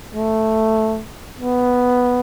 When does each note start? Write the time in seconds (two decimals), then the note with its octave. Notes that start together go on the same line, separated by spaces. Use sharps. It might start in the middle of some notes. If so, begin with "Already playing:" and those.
0.15 A3
1.40 B3